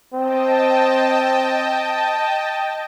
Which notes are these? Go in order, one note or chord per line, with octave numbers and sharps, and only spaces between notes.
C4 D#5 G5 A5